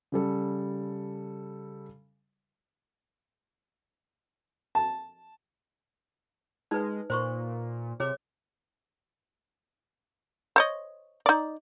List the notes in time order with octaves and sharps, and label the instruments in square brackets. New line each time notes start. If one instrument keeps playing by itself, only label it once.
[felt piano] C#3 G3 A4
[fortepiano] A5
[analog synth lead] G#3 [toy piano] D#4 B4
[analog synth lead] A#2 [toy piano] C5 C6 C#6
[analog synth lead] C3 [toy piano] G#4 C#5 D6
[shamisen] C5 C#5 D#5
D#4 D5